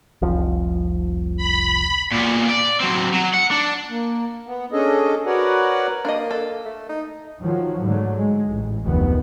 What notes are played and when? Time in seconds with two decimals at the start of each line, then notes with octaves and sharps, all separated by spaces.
0.22 F1 C2 F3
1.37 B5
2.13 A#2 B3
2.50 D5
2.81 F#3 C4
3.14 F#3
3.34 F#5
3.51 D4
3.89 A#3
4.47 B3
4.73 C#4 D4 G#4 A4 D#5
5.26 F#4 A#4 B4 C#5 D5 F#5
6.05 A#3 D4 D#5
6.31 A4
6.65 A3
6.89 D#4
7.40 D#3 F3 F#3
7.84 G#2 D3 F#3 A3
8.16 G#3
8.49 A1
8.84 F1 D2 D#3 B3